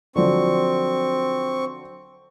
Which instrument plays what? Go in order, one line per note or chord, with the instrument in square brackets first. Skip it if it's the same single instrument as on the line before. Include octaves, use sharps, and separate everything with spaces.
[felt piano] D3 F3 F#3 [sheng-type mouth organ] C4 C#6